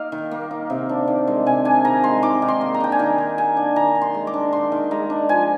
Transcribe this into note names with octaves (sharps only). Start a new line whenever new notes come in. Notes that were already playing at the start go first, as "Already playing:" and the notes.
Already playing: A#3 D#4 D#5 F5
D#3
A#3
D#4
C3
D4
D#3
G#3
C3 G#5
D4 G#5
D#3 A#5
G#3 C6
D#3 D6
D#3
C6
A#3
A#5
D4 G5
G#5
D#3 A#5
D#3
A#3 G#5
D4
D#3 A#5
D#3
C6
G#3
D6
D4
D#3 C6
D#3
G#3 A#5
D4
F3 G#5